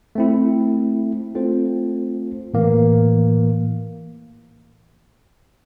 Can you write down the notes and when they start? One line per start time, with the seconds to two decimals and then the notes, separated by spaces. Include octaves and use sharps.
0.15 A3 C4 E4
1.35 A3 C4 F4 A4 C5
2.54 A2 E3 A#3